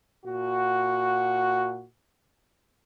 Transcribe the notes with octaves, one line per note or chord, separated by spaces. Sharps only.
A#2 F#4